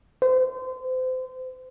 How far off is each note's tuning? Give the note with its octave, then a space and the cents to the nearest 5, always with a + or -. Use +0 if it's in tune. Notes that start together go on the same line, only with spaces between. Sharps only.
C5 -30